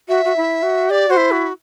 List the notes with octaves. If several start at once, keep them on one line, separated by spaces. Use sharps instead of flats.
F#4 E5
F#4
E4
F#4
G4 D5
F#4 C5
E4
F#4